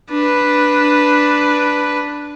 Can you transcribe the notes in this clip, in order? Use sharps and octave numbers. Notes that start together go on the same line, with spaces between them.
D4 B4